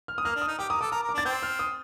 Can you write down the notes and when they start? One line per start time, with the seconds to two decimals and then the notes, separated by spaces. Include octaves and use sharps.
0.08 F6
0.18 D#6
0.25 A#3 F6
0.36 D4
0.42 D#6
0.48 D#4
0.59 G4 D6
0.70 A#4 D#6
0.81 A4 D6
0.92 A#4 D6
1.03 A#4
1.09 D6
1.14 D4
1.18 A6
1.25 C4 G6
1.43 F6
1.59 D#6